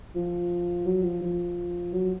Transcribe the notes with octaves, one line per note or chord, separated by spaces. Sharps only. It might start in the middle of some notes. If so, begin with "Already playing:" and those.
F3
F#3
F3
F3
F#3